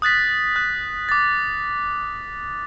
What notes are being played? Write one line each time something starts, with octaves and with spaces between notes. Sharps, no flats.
D#6 F#6 A6 B6
F#6
D6 A6